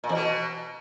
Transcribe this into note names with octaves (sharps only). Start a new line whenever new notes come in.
A#2
E2
B2